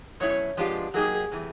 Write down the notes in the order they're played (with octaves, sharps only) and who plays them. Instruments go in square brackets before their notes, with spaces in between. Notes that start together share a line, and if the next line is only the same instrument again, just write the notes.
[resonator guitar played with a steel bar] B2 F#3 A3 C#4 E4 [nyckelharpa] C#5
[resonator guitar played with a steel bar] F3 G#3 B3 D4 F4 [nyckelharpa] G4
[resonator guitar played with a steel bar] F#3 A#3 D#4 G4 [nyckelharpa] G#4
[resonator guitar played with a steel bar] C3 E3 A3